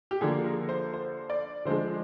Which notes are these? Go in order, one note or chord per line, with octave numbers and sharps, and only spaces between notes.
G4
D3 F3 A#3 D4 G#4
A#4
C5
C5
D5
D3 F3 G#3 D4 C5